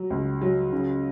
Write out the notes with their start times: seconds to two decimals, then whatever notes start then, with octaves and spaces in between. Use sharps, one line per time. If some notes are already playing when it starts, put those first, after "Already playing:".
Already playing: F#3
0.10 C#2
0.41 F#3
0.73 C#3